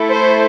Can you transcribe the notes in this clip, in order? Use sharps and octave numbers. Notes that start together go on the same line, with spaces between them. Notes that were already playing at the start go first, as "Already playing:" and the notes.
Already playing: A3 E4 A4
C5